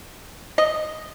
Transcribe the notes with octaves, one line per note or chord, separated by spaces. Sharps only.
D#5